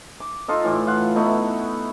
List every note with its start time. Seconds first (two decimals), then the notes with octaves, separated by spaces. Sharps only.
0.20 D6
0.48 D#4 F4 A4 D#5
0.64 A2 E3 D6
0.87 F4 F5 F#5
1.16 A3 B3 D#4 E4